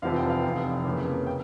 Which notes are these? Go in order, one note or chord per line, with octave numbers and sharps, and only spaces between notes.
F1 E2 C3 F3 F5
G5
F5
F1 E2 C3
F2 C#3 E3 A#3 C#4
G5